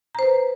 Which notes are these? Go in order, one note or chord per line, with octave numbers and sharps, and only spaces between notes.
B4 C5 A#5